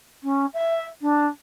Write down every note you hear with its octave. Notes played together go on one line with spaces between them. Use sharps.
C#4
E5
D4